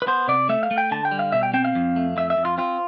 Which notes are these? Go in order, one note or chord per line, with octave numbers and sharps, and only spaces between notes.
B4
B3 C5
C3 D5
A3 E5
F5
A3
G5
D3 A5
G5
G3
F5
B2 E5
G5
C4 G5
F5
F2
A3
F2 E5
E5
F2
F4
C4 F4